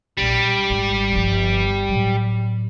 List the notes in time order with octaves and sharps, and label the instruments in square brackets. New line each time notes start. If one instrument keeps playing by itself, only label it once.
[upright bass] E1 A#1 [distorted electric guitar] G3
[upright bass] G#1
G1 F3
A2 F#3